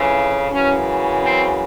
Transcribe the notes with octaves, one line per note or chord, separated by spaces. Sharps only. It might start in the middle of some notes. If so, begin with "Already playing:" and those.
Already playing: F2 C#3 E3
F#2 C#3 E3 C#4
C4